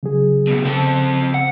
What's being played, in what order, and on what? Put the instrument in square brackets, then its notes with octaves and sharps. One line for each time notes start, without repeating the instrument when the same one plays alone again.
[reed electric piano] C#3 F#3 G#4
[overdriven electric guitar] F#2 B2
[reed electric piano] C#3 [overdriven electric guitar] C4 A4
[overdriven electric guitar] F#5